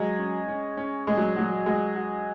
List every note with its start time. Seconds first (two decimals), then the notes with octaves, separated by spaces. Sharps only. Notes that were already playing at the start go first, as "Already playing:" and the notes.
Already playing: F#3 G#3
0.19 C#4
0.48 C#4
0.77 C#4
1.07 A#2 G#3
1.17 F#3
1.36 F#3 F#4
1.66 G#3 F#4
1.95 F#4